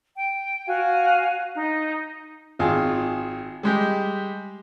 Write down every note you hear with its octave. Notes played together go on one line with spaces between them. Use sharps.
G5
F#4 F5 G#5
D#4
G#1 F4 G#4
G3 G#3 G4